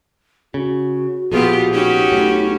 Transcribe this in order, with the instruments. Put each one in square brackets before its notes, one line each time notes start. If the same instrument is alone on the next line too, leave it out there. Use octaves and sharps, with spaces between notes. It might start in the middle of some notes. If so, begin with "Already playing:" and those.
[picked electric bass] C#3 [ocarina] F#4
[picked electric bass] A#1 B2 [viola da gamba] B3 F4 G4 [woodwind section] G#4
[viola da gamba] C#4 F#4 G4 [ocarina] D#4
[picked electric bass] B1 A2